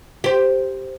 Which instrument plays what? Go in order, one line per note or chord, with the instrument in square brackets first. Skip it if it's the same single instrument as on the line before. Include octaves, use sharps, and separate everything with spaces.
[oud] G4 C5